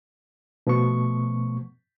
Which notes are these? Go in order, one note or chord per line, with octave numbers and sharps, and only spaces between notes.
B2 F3 A3 B3 C#6